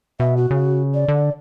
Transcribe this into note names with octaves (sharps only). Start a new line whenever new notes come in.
B2 E5
F#4
C#3
D5
D3